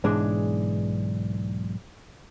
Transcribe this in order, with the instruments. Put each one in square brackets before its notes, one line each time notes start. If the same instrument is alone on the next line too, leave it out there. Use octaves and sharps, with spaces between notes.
[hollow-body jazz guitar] B1 G#2 E3 G#3 D4 G#4